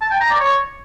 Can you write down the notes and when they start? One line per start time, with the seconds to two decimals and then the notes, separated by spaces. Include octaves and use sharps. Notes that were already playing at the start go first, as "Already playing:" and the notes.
0.02 A5
0.11 G5
0.21 A#5
0.30 D5
0.40 C#5